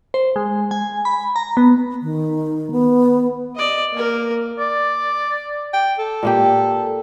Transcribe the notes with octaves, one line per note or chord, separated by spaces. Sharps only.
C5
G#3
G#5
B5
A#5
B3
D#3
B3
D5 D#5
A#3 A#4
D5
G5
A4
A#2 A#3 G4